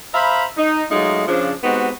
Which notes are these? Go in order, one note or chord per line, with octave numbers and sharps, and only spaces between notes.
C5 E5 F5 A#5 B5
D#4
F#3 G#3 A3 D#4 F4
C#3 F3 D4
G#3 B3 C4 D#4 F#4 G4